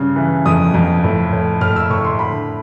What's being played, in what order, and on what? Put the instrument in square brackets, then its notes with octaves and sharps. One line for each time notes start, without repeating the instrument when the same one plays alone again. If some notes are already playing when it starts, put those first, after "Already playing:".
Already playing: [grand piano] G2 C#3
E3
F2 D#6
F2
A2
A2
A2 F6
E6
A2 C#6
C6
D3 B5